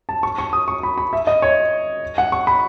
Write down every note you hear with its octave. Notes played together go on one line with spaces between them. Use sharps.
A5
C#6
C#6
D#6
C#6
B5
B5
E5
D#5
C#5
F#5
C#6
B5